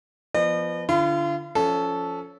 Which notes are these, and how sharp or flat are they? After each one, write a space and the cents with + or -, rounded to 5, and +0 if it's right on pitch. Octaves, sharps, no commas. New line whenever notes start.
F3 -20 B3 +0 D#5 -40
D3 -10 F4 -35 B5 +35
F3 -5 C#4 +20 A4 -10